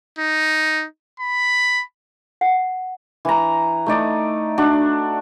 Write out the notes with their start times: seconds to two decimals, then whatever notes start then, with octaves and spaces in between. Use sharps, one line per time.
0.19 D#4
1.20 B5
2.41 F#5
3.25 E3 A#5
3.86 A3 D#4 D5
4.58 D4 F#4